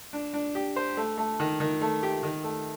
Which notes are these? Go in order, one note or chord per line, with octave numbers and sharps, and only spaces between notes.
D4
D4
G4
C5
A3
A3
D#3
D#3
A3
G4
D#3
A3